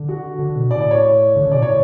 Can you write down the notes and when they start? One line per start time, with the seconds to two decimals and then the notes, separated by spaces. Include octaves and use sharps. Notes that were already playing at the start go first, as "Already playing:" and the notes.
Already playing: D3
0.09 F#4
0.39 D3
0.55 B2
0.70 A2 D5
0.81 D5
0.91 C#5
1.36 D3
1.45 C#3
1.52 B2 D5
1.62 A2 C#5